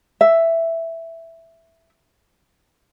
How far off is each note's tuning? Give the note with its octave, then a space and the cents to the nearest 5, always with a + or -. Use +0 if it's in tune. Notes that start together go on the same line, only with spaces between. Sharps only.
E5 +5